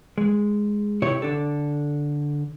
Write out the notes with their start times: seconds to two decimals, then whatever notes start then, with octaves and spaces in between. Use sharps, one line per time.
0.18 G#3
1.02 C3 E4 G4 C#5
1.22 D3 D4 A4